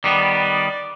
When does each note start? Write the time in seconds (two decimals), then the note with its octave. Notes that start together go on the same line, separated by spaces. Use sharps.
0.04 D#3 G3 B3 D5